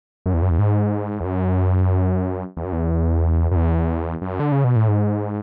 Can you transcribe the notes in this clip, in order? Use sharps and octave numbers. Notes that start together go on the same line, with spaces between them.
F#2
E2
F#2
E2
G#2
E2
F#2
E2
F#2
E2
F#2
E2
F#2
D3
C#3
B2
A2
G#2